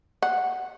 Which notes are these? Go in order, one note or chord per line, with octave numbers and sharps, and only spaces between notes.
F#5